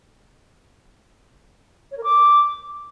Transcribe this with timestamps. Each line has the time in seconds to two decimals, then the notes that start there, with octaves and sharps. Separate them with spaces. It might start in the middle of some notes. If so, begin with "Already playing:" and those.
1.91 C#5
1.98 A#4
2.04 D6